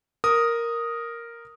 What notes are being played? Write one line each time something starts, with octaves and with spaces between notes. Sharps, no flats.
A#4 D#6